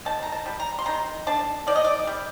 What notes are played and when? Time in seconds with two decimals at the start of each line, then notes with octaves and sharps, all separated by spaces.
0.05 D#3 A5
0.23 A#5
0.32 A5
0.46 G3
0.60 A#5
0.79 C6
0.86 D#3 A#5
1.27 D4 A5
1.67 D#3 D5
1.76 D#5
1.84 D5
2.07 G3